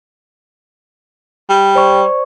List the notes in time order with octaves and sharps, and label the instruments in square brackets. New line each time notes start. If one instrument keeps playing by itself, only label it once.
[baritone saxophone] G3
[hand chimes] C5 D5 C#6